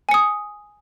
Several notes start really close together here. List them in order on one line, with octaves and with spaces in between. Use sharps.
G#5 C#7 D#6